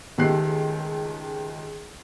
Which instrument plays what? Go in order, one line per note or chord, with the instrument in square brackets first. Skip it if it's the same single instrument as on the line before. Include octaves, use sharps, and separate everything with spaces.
[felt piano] C#2 D#3 A3 G4 F#6 C7